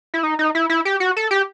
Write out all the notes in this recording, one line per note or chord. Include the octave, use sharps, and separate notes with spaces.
E4
D#4
D#4
E4
E4
G4
F#4
A4
G4